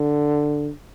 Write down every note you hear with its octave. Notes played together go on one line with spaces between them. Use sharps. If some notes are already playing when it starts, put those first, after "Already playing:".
Already playing: D3